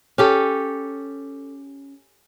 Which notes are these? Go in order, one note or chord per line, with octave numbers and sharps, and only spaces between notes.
C#4 G4 A4